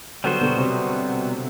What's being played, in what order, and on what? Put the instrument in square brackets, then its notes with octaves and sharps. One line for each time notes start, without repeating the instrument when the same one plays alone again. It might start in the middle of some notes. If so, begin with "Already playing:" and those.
[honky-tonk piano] D3 F#3 [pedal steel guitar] G3 B3 F#4 C5
[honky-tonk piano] B2 D3
C3